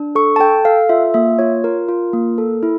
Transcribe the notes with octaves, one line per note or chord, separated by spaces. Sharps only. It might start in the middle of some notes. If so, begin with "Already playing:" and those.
Already playing: D4
A4 C#6
A5
A4 G5
A4 F5
F4 E5
A#3 E5
F4 C#5
F4 A#4
F4
A#3
A4
E4